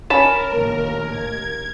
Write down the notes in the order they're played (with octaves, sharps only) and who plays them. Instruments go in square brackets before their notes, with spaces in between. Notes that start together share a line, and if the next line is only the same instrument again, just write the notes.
[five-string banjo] C#4 B5 [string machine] A#4 [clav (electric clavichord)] A5
[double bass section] A#1 D#2 A2
[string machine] G#6